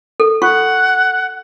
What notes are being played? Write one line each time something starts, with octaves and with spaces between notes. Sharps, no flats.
A4
F4 F#5 C#6